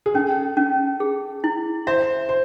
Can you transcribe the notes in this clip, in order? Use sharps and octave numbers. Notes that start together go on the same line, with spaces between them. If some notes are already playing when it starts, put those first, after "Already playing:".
G#4
C#4 A4
C#4
G#4
E4
C5 E5
C5